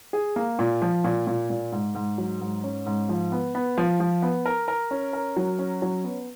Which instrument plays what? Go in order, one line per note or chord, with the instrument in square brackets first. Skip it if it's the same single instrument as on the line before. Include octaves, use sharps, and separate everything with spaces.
[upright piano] G#4
A#3
A#2
F3
A#2
A#2
A#2
G#2
G#2
F#3
G#2
C#4
G#2
F3
B3
B3
F3
F3
B3
A#4
A#4
C#4
A#4
F#3
C#4
F#3
B3